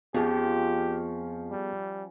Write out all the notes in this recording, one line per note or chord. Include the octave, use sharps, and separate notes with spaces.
F2 F3 B3 C#4 G4 G#4
G3